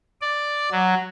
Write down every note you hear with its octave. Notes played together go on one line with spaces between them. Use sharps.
D5
F#3